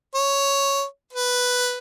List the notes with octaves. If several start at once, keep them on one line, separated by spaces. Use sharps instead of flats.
C#5
B4